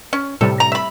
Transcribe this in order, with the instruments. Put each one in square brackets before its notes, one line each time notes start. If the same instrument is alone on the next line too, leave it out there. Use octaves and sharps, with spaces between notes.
[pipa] C#4
[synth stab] A2 C3 G3 [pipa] A4
[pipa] A#5
E5 B5